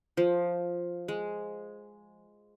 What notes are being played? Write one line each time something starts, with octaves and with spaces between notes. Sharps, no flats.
F3
G#3